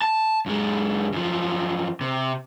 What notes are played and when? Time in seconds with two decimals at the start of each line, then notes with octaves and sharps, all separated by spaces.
0.02 A5
0.46 F#2 G#3
1.13 F#2 F3
2.01 C3